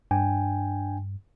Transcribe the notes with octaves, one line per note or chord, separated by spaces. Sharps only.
G2 D4 G5 G#5